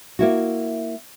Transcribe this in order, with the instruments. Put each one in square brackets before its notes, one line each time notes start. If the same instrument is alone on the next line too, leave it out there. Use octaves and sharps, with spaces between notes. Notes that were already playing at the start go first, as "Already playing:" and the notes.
[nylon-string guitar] A#3 E4 F#4